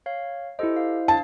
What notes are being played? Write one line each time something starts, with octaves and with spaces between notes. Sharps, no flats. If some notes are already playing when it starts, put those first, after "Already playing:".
C#5 F5
E4 G4 A4 C5 D#5
C5 F5
D4 F5 A5